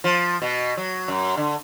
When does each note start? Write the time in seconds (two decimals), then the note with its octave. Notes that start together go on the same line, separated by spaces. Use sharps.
0.04 F3
0.42 B2
0.77 F#3
1.08 F#2
1.37 D3